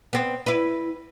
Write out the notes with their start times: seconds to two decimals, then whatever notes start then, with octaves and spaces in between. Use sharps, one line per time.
0.13 B3 C4
0.46 E4 B4